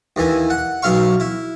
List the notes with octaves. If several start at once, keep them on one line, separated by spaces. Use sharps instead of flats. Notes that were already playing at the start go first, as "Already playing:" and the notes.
D#2 E3 G#5
F#5
B1 E5 F5 C#6
E4